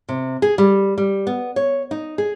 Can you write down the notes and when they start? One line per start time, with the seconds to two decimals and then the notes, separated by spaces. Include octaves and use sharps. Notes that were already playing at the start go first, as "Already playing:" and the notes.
0.09 C3
0.42 G#4
0.58 G3
0.98 G3
1.27 B3
1.56 C#5
1.91 D#4
2.18 G#4